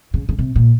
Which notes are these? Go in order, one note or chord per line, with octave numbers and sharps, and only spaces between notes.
C#3
C#3
C3
A#2